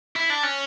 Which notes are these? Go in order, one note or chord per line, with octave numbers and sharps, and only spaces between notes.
E4
D4
C#4